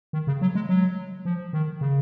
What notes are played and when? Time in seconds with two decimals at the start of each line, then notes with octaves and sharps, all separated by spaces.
0.13 D#3
0.27 C#3
0.42 F#3
0.55 G#3
0.69 F#3
1.25 F3
1.53 D#3
1.81 C#3